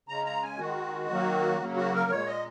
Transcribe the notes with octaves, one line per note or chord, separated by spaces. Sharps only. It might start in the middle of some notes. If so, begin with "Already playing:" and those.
C#3 G#3 A#5
A#5
G#5
D#3 G#3 F#4
D#3 F#3 A#3
C#3 F#3 A#3
F#4
A#4
A#2 G#3 C#5
D#5